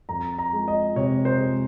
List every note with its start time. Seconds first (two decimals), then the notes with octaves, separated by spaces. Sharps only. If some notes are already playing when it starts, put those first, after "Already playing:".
0.09 F2 A#5
0.39 A#5
0.53 G#3
0.68 D#5
0.96 C3 C#5
1.25 C5
1.39 G#3